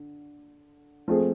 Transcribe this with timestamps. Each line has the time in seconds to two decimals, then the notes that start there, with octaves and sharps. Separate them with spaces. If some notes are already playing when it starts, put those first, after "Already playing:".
Already playing: D3
1.08 F3 A3 C4 G#4